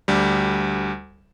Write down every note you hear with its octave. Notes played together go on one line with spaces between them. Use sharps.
D2 G3